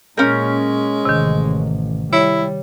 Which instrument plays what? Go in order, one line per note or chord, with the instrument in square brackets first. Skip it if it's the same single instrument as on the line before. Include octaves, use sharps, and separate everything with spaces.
[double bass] A#2 [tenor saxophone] G#3 [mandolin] C#4 A#4 [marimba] G6
[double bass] A1 [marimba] C3 D#3
[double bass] G3 [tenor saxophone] E4 [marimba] C#5